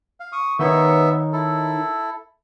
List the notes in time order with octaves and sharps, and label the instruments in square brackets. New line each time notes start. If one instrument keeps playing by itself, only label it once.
[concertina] F5
C#6 D#6
[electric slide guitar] D#3 D#4 C#5 [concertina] B3 E5
[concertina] E4 A4